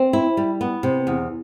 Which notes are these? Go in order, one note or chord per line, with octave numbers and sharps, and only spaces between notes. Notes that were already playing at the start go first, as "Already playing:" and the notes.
Already playing: C4
E4
G3
B3
C3
E2